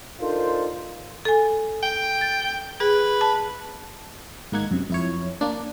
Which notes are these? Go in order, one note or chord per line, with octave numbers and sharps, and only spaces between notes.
D4 D#4 F4 A4 A#4 C5
A4 G#5
G5
A6
G#4 B4
A5
G#2 D#3 A#3 D#4 F#5 G#6
F#2 C3
F2 E4 C#5
A#3 D4